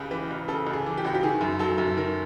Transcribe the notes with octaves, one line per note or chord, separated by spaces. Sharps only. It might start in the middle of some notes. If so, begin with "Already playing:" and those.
Already playing: C#2 C#3 G4
E3 B4
C#2
C#3 A4
C#2
G#4
E3
G4
C#2 F#4
G4
D#3 G#4
F#2
F#3 A4
F#2
D#3 A#4